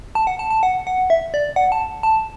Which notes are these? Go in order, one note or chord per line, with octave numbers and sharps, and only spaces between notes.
A5
F#5
A5
A5
F#5
F#5
E5
D5
F#5
A5
A5